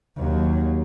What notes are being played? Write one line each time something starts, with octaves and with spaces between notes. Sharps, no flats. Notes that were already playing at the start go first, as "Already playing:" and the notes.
D#2 F#3